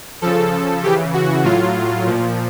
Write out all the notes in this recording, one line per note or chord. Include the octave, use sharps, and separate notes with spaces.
C#3 F3 A4
C#3 E3 G4
F#4
A2 F#3 F4
A#2 F3